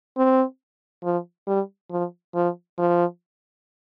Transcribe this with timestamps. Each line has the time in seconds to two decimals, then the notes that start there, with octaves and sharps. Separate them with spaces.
0.17 C4
1.04 F3
1.47 G3
1.91 F3
2.35 F3
2.79 F3